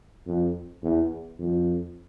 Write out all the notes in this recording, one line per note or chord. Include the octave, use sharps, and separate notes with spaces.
F2
E2
F2